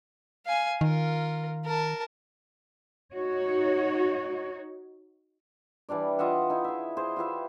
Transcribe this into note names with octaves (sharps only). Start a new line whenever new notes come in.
F5 G#5
D#3 F4 A#4
A#4 A5
D#4 F#4 C#5
E3 G3 D4 D5
F4 D#5 E5 F#5
D#4 E4
G#4 E5
G#4 C5
F4 G4 B4 E5